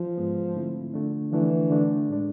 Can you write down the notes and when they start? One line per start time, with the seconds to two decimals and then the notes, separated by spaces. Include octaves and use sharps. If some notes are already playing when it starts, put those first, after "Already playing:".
Already playing: F3
0.18 G#2 G#3 B3
0.56 D3 A3 C4 E4
0.94 D3 A3 D4
1.32 D3 E3 F3 A3 D4
1.70 D3 A3 D4
2.09 A2 G#3 D4